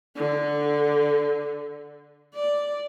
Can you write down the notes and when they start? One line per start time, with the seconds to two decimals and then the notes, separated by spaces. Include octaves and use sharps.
0.16 D3
2.34 D5